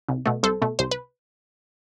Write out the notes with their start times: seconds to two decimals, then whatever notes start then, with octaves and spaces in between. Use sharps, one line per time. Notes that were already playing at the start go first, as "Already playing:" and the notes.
0.09 C2
0.26 B2 A3
0.43 C2 A4 C5
0.62 B2 A3
0.79 C2 C5
0.91 B4